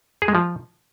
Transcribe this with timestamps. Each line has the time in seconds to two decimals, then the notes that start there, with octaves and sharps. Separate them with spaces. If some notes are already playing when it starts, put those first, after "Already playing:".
0.22 G#4
0.28 G#3
0.35 F3